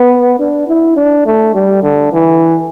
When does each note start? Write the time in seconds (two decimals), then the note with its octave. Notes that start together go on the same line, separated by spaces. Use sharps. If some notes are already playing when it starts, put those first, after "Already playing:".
Already playing: B3
0.39 D4
0.68 E4
0.97 D4
1.26 A3
1.54 G3
1.83 D3
2.12 E3